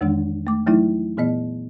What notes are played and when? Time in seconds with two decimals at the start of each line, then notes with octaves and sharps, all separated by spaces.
0.01 F2 D#3 E3 G#3 D4
0.47 A3 D6
0.66 E3 F#3 A3 D#4 E4
1.17 A#2 E3 B3 D#5